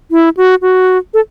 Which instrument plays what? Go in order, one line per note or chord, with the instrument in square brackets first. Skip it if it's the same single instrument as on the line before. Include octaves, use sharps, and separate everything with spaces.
[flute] E4
F#4
F#4
A4